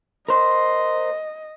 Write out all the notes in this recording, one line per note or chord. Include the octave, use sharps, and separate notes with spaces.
A#4 C5 D#5